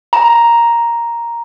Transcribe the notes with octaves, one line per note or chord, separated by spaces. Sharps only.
A#5